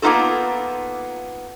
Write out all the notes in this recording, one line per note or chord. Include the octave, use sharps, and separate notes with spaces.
A#3 B3 D#4 F4 A4